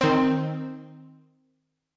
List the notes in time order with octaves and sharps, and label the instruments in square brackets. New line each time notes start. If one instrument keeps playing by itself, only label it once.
[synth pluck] D#3 C4